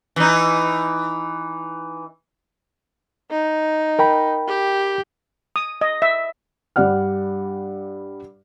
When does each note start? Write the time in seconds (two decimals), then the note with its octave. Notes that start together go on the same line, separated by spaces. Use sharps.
0.16 E3 D#4
3.31 D#4
3.99 A#4 G5 B5
4.47 G4
5.56 D#6
5.81 D#5
6.02 E5
6.76 G2 G3 D5 F#5 F6